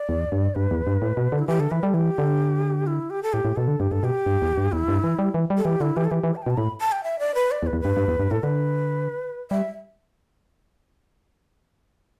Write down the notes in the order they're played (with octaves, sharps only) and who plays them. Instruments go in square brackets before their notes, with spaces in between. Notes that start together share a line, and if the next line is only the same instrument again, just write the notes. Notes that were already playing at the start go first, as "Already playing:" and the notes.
Already playing: [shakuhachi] D5
[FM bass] E2
G2
[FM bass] G2 [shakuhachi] B4
[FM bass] E2
G2
A2
B2
D3
[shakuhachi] E4
[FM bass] E3 [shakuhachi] G4
[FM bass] D3 [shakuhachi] A4
[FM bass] E3 [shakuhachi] B4
[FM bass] G3 [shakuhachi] A4
[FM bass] E3 [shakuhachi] G4
[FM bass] D3
[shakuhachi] E4
G4
A4
[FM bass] A2 [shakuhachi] G4
[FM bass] A2
[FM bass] B2 [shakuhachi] A4
[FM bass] D3
[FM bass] G2 [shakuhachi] G4
[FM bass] G2 [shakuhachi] A4
[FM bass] B2 [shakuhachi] G4
[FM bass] G2
E2
G2
[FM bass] E2 [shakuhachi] E4
[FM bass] G2
E3
G3
E3
G3
[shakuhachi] A4
[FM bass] E3 [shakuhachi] G4
[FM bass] D3 [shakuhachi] E4
[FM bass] E3 [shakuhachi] G4
[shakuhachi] A4
[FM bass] E3 [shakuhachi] G4
[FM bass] E3
[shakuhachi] A5
G5
[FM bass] B2
[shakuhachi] A5
[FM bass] A2 [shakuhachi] B5
[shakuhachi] A5
G5
E5
D5
B4
D5
[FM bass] E2
[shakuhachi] B4
[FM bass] E2
[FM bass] G2 [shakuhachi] B4
[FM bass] G2
E2
G2
[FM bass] A2 [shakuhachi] A4
[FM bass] D3 [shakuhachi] B4
[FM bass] G3 [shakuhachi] E5